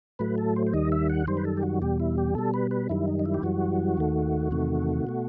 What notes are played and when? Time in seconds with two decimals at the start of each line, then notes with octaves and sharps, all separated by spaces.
0.19 A2 F#3 A3 B4
0.38 A4
0.56 C5
0.67 C5
0.73 D#2 D#3 G3 D#5
0.92 E5
1.10 F#5
1.27 F#2 D#3 G3 C5
1.37 B4
1.45 A4
1.57 G4
1.63 F#4
1.82 E2 B2 G3 G4
2.00 E4
2.18 G4
2.35 B2 G3 A4
2.54 B4
2.71 B4
2.89 F#2 D#3 G3 E4
3.08 D#4
3.19 D#4
3.26 E4
3.34 G4
3.43 F#2 E3 G3 F#4
3.97 D#2 D#3 A3
4.51 E2 C3 D#3 A3
5.07 B2 A3